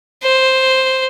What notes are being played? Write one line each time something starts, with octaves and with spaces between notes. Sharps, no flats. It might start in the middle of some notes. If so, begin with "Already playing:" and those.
C5